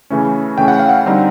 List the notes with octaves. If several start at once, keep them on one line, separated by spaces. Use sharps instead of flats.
C#3 E3 A3 C#4
C#3 E3 A3 C#4 G5
F#5
F5
F#5
D3 G3 C4 D#4